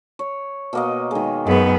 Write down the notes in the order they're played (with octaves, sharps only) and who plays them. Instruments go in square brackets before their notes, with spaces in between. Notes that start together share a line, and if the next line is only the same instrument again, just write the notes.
[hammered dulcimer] C#5
B2 A#3 D#5
D#3 G#3
[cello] F#2 B3 [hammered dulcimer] G#3 G#4